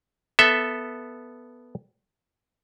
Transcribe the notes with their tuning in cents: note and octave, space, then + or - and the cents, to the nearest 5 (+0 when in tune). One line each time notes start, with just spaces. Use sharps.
B3 +0 A4 +0 E5 +0